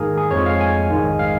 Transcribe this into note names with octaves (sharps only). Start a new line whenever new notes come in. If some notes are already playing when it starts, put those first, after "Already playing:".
Already playing: G#2 D#3 A#3 G#4 A#4
G#4
F2 F3 G#3 C#5
F5
G#5
A#1 G#2 D#3 G#3
F5